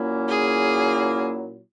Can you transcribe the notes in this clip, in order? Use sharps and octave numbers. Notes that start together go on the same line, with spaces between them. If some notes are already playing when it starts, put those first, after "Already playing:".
Already playing: A#2 F#3 A#3 C#4 E4
G#4